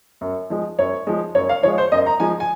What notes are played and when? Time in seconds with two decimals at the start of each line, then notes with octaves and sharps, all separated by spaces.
0.21 F#2
0.50 F3 G#3
0.79 F#2 C#5
1.07 F3 G#3
1.35 F#2 C#5
1.49 F5
1.63 F3 C#5
1.67 G#3
1.78 C5
1.92 F#2 D#5
2.06 A#5
2.20 F3 G#3 G#5
2.40 G#5